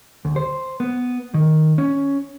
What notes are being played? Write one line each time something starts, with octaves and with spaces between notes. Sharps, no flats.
D2
C5
B3
D#3
C#4